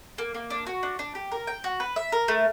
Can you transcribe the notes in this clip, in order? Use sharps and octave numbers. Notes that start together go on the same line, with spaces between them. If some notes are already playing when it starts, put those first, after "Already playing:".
A#3
A#3
D4
F#4
D4
D4
G4
A#4
G5
F#4
B4
E5
A#4
A3